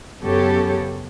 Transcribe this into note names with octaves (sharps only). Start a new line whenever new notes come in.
F#2 C#3 B3 G4 A4 C#5